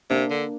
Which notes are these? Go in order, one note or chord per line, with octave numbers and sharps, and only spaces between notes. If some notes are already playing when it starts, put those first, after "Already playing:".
C3 A#3 D4
D3